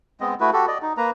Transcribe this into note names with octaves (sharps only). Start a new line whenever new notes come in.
G#3 B3 C4 D#5
A3 E4 F#4 B4
F#4 G4 A4
D5 D#5
D#4
A#3 B4 A#5